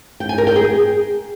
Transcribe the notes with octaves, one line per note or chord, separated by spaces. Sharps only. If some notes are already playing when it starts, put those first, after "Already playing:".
G5
G#5
A#4
G5
G#4